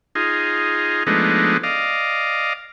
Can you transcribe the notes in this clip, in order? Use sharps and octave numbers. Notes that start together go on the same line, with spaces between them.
D#4 F4 G#4
F3 G#3 A3 B3 D4 D#4
D5 D#5 F5